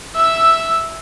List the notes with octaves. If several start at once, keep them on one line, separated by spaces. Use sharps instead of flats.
E5 E6